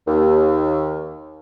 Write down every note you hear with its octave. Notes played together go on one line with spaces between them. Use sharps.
D#2